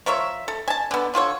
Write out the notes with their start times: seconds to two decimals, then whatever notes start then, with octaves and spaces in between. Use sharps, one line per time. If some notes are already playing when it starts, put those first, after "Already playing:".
0.06 F3 A#4 C#5 E5
0.48 A4
0.68 G#5 A5
0.91 D3 B3
1.14 D3 F4 A4 C#5